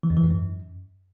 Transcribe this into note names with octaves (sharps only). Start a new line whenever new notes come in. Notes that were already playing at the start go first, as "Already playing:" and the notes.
E3
F2
E3
G#2
F#2